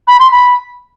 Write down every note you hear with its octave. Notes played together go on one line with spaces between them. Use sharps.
B5
C6
B5